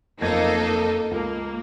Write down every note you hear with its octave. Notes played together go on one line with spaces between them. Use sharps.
F#1 F2 A#3 D#4 A4 G#6
C#2 A#3